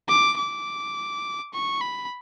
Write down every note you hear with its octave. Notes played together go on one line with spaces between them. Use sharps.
D6
D6
C#6
B5